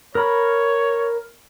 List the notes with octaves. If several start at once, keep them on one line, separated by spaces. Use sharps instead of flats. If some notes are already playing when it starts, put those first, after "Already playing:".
A#4 C#5 B5